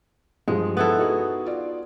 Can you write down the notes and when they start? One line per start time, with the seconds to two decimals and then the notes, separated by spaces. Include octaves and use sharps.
0.48 G2 F3 G3 G#3
0.77 B3 E4 A4
0.98 D#4 F#4 G#4
1.46 F4 D5